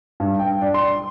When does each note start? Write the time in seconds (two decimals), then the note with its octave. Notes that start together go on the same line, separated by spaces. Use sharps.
0.20 G2
0.39 G5
0.62 D4
0.74 C6